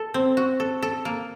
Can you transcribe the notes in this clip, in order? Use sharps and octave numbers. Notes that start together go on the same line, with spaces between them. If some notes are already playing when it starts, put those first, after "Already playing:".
Already playing: A4
C4
F#4
A4
A4
A#3